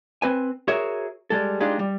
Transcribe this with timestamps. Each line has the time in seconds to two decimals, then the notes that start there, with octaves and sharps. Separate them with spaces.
0.22 C4 B4 G#5
0.68 F#4 G#4 A#4 C#5 E5
1.30 G3 G#3 A4
1.60 G#3 D4 D#4 F4 G4 G#4
1.79 G3